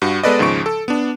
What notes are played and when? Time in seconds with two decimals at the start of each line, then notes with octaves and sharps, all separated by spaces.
0.02 G2 F#4 C#6
0.23 G#3 B3 A4 B4 D5 D#5
0.39 D#2 G#2 C#3 F3 C#6 D7
0.66 A4
0.88 B3 D4